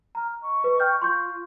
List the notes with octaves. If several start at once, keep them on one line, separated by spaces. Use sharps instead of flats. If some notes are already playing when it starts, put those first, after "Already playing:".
A#5 F6
D#5 C#6
B4
G5 F6 G6
F4 C6 C#6 G6